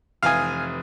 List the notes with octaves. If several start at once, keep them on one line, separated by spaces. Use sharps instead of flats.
F1 E3 F5 G#5 D#6